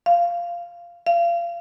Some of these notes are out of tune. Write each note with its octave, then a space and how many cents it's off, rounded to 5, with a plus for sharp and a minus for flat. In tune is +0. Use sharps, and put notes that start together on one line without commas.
F5 -10
F5 -30